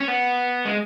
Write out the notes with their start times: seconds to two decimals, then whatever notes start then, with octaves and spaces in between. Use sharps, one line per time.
0.01 C#4
0.08 B3
0.66 G#3